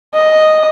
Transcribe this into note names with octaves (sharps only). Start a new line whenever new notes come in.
D#5